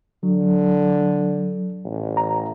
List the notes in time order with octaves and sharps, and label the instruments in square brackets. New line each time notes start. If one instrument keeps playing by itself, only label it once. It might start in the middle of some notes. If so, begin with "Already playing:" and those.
[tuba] D3 [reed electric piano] F#3
[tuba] A1
[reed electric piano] A#5